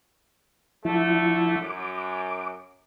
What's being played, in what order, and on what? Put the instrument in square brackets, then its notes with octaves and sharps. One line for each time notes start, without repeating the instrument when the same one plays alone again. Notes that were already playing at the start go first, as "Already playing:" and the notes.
[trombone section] D3 A3 [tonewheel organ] F3 E4
[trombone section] F#2 [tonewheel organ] D6